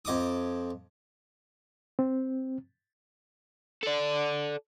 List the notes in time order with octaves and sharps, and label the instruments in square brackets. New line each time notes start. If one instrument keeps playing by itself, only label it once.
[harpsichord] F2 D#5 D6 D#6
[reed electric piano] C4
[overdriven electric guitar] A4 D5